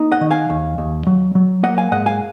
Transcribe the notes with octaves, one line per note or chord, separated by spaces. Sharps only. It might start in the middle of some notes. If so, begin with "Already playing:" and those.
Already playing: A#3 D#4
D#5 F#5
D#3
F5 G#5
D#2
D#2
F#3
F#3
A#3 D#5 F#5
F5 G#5
G#2 D#5 F#5
F5 G#5